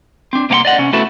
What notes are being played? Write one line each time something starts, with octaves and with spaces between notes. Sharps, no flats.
C4 D4
C2 A#3 B3 F5 F#5 C6
D5 D#5 F#5
C3 C#4
A3 B3 E4 F#4 A4